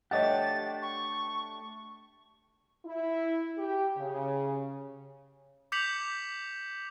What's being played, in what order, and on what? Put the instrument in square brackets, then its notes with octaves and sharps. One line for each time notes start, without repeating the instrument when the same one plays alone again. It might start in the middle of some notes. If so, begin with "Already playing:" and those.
[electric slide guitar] A3 D4 G4 [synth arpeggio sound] C#5 D#5 F#5 [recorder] A6
[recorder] C#6
[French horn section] E4
G4
C#3
[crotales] D6 G6 B6 C#7 F7 F#7